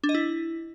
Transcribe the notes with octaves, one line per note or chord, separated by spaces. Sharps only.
D4
D#5
E4